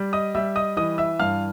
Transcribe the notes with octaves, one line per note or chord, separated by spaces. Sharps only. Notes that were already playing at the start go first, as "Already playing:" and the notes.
Already playing: G3
D#5 D#6
G3 E5 E6
D#5 D#6
E3 D#5 D#6
E5 E6
G2 F5 F6